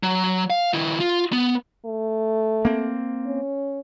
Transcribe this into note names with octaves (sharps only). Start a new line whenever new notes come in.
F#3
F5
D#3 E4
F4
B3
A3
A#3 C4
C#4